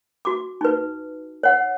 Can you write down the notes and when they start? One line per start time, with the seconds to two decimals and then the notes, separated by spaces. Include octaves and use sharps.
0.25 F#4 D6
0.61 D#4 B4
1.43 C#5 F#5